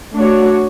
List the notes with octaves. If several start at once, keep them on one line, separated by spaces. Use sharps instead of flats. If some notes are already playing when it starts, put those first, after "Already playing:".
A3 D4 F#4 C#5